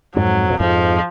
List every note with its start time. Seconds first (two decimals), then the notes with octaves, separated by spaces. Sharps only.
0.16 F2 G#2 F#3
0.50 A#2
0.60 F2 G#2 F3